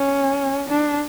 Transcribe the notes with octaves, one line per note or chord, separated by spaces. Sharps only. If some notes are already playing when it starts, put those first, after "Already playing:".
Already playing: C#4
D4